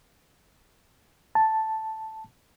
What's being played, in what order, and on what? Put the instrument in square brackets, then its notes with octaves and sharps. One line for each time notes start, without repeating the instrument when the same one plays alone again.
[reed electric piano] A5